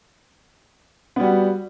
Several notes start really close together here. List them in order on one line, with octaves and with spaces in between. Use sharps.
B3 G3 F#4